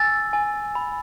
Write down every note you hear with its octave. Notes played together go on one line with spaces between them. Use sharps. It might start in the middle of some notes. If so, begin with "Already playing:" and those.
Already playing: G#5 E6 A6
G#5
B5